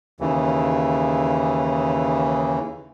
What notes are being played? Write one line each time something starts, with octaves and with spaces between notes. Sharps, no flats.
D#2 C#3 E3